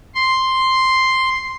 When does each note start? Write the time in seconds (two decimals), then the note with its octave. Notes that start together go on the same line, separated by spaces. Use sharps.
0.15 C6